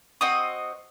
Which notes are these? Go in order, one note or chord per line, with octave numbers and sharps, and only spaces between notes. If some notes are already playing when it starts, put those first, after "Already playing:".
C4 F#4 D#5 D#6